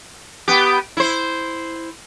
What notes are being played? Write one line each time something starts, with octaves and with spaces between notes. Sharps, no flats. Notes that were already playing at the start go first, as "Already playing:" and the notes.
B3 G4
E4 C5